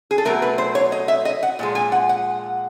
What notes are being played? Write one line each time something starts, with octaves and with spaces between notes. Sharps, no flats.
G#4
A4
B2 F#3 A3 A#4
B4
C5
C#5
D#5
E5
D#5
F#5
A#2 F3 G#3
G#5
F#5
F#5